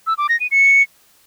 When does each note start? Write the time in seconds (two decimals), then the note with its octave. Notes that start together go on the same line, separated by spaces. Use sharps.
0.07 E6
0.18 D6
0.29 A#6
0.40 D#7
0.51 C#7